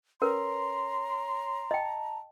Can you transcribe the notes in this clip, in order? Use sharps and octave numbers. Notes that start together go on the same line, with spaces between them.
C#4 A#4 B4 C#5 A#5 C6
D#5 G5 A5